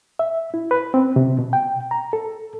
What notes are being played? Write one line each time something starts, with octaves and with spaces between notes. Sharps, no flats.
E5
E4
B4
C4
C3
B2
G5
A#5
A4